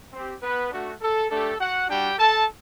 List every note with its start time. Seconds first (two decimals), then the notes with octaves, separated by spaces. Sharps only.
0.13 C4 G4
0.42 B3 B4
0.72 A3 D4 F#4
1.01 A4
1.30 A3 D4 G4 A4
1.59 F#4 F#5
1.89 G3 D4 F#4 G4 G5
2.18 A4 A5